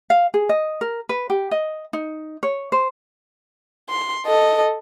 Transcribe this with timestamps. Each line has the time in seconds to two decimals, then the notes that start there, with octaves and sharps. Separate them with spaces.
0.10 F5
0.34 G#4
0.49 D#5
0.81 A#4
1.09 B4
1.30 G4
1.51 D#5
1.93 D#4
2.43 C#5
2.72 C5
3.90 C6
4.26 A4 D#5